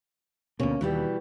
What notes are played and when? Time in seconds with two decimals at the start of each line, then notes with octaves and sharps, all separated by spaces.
0.60 D2 B2 A#3 C#4
0.81 D#2 B2 E3 G3